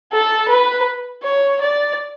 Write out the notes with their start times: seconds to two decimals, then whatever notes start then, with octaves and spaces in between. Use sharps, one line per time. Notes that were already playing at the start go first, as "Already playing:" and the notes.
0.12 A4
0.49 B4
1.23 C#5
1.61 D5